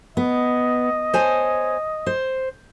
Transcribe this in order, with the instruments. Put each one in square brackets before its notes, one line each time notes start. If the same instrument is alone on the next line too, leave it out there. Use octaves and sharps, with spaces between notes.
[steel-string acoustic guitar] B3 [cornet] D#5
[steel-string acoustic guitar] C5 C#5 G#5
C5